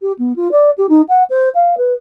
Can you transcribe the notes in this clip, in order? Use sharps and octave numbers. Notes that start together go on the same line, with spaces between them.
G4
B3
F4
D5
G4
D#4
F#5
C5
F5
B4